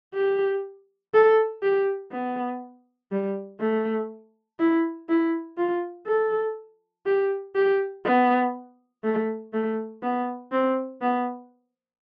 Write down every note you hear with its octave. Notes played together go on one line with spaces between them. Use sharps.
G4
A4
G4
B3
G3
A3
E4
E4
F4
A4
G4
G4
B3
A3
A3
B3
C4
B3